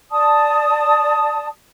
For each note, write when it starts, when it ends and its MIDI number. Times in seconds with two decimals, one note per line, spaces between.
0.11 1.48 74
0.11 1.48 81
0.11 1.48 87